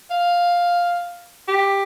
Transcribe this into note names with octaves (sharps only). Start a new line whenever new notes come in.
F5
G4